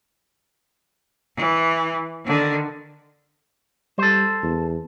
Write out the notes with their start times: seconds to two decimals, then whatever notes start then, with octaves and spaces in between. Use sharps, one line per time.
1.36 E3
2.25 D3 D#3
3.98 G3 A4 C5
4.43 E2